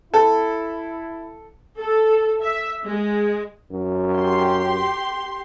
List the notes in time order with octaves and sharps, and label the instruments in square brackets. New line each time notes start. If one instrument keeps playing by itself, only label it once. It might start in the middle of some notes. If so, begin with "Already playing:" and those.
[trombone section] E4 [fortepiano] A4
[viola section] A4
E5
G#3
[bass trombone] F#2
[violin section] G4 C6